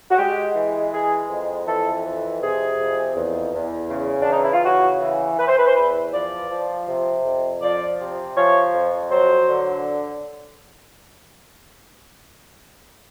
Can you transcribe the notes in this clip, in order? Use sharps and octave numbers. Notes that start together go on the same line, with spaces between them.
F#4
G#3 G4
E3
G#3 G#4
F2
E3 A4
F2
C3 G#4
F2
E2
E2
C#3
D4
E3
D#4
E4
F4
C#3 F#4
E3
E3 B4
C5
B4
C5
E2 B4
F3 D5
F3
C3
F2
F3 D5
C3
F3 C#5
F2
F#3 C5
D3